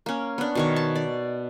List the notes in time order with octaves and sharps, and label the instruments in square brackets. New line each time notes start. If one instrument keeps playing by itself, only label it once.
[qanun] A#3 C#4
B3 D4
B2 D#3 C#5
A5
D5